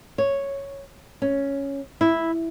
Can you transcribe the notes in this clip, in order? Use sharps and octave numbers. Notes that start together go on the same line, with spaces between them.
C#5
C#4
E4